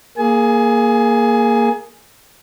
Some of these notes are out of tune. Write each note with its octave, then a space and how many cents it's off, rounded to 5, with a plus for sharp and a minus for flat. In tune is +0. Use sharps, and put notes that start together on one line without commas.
A#3 +0 G#4 +0 G#5 +35